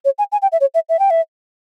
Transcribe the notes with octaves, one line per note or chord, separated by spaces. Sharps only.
C#5
G#5
G#5
G5
E5
C#5
E5
E5
G5
E5